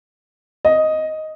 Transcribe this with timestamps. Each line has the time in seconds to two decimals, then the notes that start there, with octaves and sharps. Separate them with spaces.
0.65 D#5